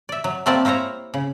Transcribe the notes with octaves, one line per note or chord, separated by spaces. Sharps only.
D5 E5
F#3
A3 A#3 C4 G4 D5 A5
A#3 E4 C5 C#5 A#5
C#3